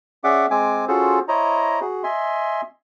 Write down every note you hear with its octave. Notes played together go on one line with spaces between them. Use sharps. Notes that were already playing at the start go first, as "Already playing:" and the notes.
C#4 G#4 D5 E5 F#5 D6
G#3 C4 G#5 D6
C#4 F4 F#4 G#4 A4 C5
E4 C5 C#5 D#5 A#5
F#4 G#4
D#5 E5 G#5 C6